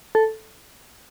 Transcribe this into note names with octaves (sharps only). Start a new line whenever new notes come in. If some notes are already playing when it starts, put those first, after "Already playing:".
A4